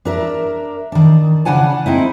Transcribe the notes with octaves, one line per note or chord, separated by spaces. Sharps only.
D4 A#4 E5
D#3 D4
C#3 D4 F#5 G#5 A5
C4 D#4 E4